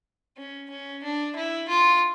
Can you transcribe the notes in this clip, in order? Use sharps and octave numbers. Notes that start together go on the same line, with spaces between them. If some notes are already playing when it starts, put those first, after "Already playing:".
C#4
C#4
D4
E4
F4